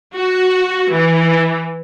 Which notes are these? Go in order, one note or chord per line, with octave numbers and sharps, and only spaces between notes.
F#4
E3